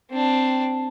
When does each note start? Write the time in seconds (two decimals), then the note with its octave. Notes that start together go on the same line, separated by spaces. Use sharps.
0.11 C4 D4